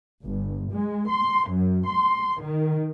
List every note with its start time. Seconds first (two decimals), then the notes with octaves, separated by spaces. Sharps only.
0.24 G1
0.72 G#3
1.08 C6
1.48 F#2
1.88 C6
2.41 D#3